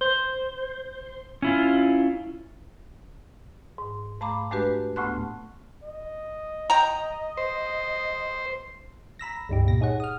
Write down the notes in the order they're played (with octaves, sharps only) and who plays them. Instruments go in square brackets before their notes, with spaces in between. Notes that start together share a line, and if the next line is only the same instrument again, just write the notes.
[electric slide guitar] C5
C#4 E4 F4
[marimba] G#2
G#2 A3 F5 A#5 B5 D6
G#3 A3 D4 F#4 G4 B4
D2 A2 A3 B3 C6 F#6
[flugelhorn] D#5
[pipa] G5 A#5
[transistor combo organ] C5
[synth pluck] A#5 B5 E6 A#6
C#2 G2 D#4 G4
A#2 A#6
D#4 G#4 C#5 F#5
D#6 F6